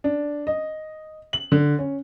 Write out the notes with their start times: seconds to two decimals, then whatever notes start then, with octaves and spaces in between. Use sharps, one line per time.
0.04 D4
0.47 D#5
1.33 F#7
1.52 D3
1.79 C#4